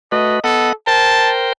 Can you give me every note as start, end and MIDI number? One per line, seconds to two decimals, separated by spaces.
0.12 0.40 57
0.12 0.40 66
0.12 0.40 71
0.12 0.38 75
0.44 0.73 59
0.44 0.72 69
0.44 0.73 75
0.44 0.73 78
0.87 1.53 70
0.87 1.53 72
0.87 1.53 79
0.87 1.32 81